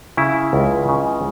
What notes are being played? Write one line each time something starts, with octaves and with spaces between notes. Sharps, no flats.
C#3 E4
C#2
C#3